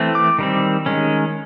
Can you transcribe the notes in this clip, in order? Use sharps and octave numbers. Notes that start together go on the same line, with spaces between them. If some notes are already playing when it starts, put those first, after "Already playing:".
Already playing: E3 A3 C4
D6
D#3 G3 C4
D#3 G#3 C#4